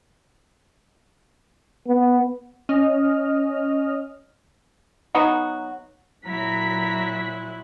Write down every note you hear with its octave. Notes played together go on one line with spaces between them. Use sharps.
B3
C#4 D#5 F6
F#3 B3 D#4 F#4
A#2 F#3 E4 A#5 F#6 B6